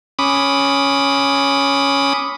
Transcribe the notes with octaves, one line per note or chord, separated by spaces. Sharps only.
C#4 B5 D6 D#6